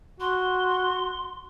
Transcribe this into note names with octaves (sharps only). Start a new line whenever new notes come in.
F#4 C6